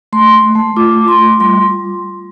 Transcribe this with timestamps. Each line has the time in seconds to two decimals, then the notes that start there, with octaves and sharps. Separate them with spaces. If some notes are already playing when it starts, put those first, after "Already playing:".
0.13 A3 C6
0.34 A3
0.55 A3
0.77 F4 D6
0.98 F4
1.08 C6
1.19 F4
1.40 G3 C6